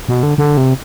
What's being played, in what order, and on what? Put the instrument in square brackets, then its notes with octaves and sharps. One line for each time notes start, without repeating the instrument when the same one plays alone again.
[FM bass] B2
D3
D3
C3